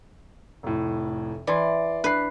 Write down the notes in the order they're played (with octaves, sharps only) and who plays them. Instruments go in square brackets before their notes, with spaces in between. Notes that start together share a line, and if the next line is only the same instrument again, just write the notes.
[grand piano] F1 A2
[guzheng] E3 [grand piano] D5 C6
[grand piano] D4 C7 [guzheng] B4